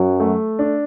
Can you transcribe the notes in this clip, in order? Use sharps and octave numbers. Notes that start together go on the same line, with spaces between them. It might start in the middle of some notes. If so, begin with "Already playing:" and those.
Already playing: F#2 F#3
A3
D4